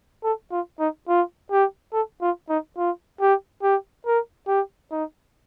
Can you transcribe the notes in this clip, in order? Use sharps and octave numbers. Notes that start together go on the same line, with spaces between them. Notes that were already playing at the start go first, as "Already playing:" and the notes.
A4
F4
D#4
F4
G4
A4
F4
D#4
F4
G4
G4
A#4
G4
D#4